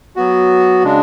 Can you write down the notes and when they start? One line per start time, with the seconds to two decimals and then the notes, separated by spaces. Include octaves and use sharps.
0.16 F#3 B3 F#4
0.84 C#3 G#3 D4